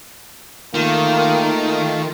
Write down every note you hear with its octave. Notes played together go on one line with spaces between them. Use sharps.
D#3 A3 A#3 F4